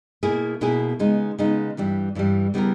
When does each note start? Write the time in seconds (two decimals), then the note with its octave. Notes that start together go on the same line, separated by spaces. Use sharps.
0.23 B2 A#3 E4 G#4
0.61 B2 A#3 E4 G#4
0.99 C#3 G#3 B3 D#4
1.39 C#3 G#3 B3 D#4
1.77 G2 E3 G3
2.15 G2 E3 G3
2.54 C#3 G3 B3 E4 A#4